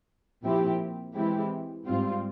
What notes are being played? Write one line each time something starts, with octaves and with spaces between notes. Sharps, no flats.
A#2 F3 C4 E4 G4
E3 G#3 C4 E4 G4
G#2 G3 C4 F4